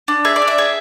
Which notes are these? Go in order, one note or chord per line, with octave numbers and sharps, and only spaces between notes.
D4
G#4 E5
D5
D4
E5
G#4